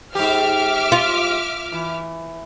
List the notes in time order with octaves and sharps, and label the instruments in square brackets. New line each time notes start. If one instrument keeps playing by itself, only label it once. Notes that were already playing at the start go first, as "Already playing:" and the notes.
[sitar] G#2 G4 [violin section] E5 D6 F6
[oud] F4
[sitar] E3